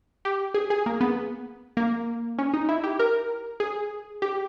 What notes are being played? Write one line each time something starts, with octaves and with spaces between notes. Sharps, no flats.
G4
G#4
G#4
A#3
B3
A#3
C#4
D#4
E4
G4
A#4
G#4
G4